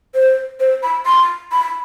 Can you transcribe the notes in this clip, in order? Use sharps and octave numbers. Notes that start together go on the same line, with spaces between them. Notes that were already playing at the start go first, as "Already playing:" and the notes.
C5
C5
B5
C6
B5